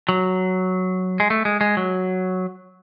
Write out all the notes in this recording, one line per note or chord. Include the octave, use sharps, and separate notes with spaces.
F#3
G#3
A3
G#3
G#3
F#3